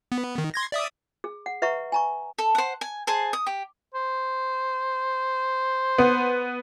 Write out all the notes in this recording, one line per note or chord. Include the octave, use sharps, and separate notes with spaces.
B3
D#3
C6 G#6 A#6
D5 E5 D#6
G#4
F#5
B4 E5 F#5 A#5 C#6
G#5 A#5 C#6
A4
C5 F#5
G#5
G#4 C5 G#5 A5
D#6
G4
C5
B3